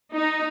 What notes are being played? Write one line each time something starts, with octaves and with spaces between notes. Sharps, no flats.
D#4